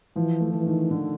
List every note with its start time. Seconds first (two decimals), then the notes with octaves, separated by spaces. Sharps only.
0.16 E3 F3
0.41 A3
0.54 E3
0.67 D#3
0.91 D3